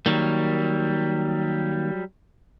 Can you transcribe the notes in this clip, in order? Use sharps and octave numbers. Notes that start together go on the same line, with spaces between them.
D#3 F#3 G3 A#3